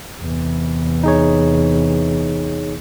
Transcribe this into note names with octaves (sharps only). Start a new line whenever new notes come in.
E2 C3
D#4 G#4 C#5